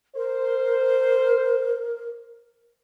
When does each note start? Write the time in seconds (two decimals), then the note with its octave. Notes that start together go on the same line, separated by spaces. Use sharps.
0.15 A#4 C5